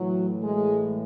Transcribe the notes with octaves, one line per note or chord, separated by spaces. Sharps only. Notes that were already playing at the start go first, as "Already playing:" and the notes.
Already playing: A2 E3 F#3
G#3